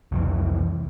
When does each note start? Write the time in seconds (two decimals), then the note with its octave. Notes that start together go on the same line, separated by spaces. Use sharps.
0.12 C2 F2 E3